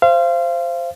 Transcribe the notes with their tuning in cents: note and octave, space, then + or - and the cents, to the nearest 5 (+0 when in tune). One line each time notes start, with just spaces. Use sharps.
C5 +0 F5 -30